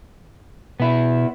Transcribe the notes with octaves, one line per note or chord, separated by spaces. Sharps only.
B2 B3 E4